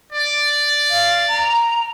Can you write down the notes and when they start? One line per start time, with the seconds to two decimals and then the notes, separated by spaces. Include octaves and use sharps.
0.13 D5
0.90 F5
1.28 A#5